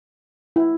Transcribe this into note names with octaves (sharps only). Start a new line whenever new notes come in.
E4